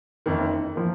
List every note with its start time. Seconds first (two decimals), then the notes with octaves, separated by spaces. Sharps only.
0.26 F#1 F2 D#3
0.75 F3 A#3